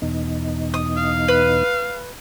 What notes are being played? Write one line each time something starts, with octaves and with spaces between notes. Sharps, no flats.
E2 B2 D#4
D#6
F5
B4